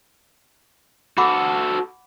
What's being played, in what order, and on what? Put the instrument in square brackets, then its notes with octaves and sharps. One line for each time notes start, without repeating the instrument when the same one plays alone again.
[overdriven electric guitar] F#4 A4 [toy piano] F#5 B5 D6